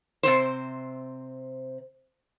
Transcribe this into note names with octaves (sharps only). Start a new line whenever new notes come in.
C3 C4 C5